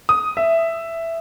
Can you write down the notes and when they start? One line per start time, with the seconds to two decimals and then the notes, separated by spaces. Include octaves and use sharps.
0.09 D#6
0.37 E5